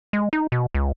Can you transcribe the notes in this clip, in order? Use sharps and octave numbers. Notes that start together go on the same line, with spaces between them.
G#3
D#4
B2
C#2